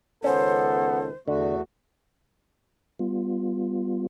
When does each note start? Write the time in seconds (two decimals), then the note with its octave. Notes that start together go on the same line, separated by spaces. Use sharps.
0.24 C#2 D#3 B3 C#4 A4 C5
1.28 E2 D3 A3 F#4
2.99 G3 B3 F4